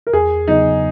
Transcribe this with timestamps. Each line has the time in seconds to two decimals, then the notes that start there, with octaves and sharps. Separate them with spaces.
0.07 A#4
0.13 E2 G#4
0.48 C#3 F#3 B3 D#4